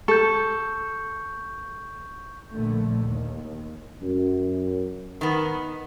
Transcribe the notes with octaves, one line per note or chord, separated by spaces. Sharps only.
A4 C#6 G6
A#1 D3 A3
D#2
F#2
D#3 B3